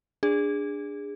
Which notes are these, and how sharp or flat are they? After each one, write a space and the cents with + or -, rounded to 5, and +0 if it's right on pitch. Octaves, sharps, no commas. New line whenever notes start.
D4 +0 G#4 -20